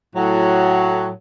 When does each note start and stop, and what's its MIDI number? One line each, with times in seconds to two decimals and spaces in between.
0.16 1.09 45
0.16 1.09 54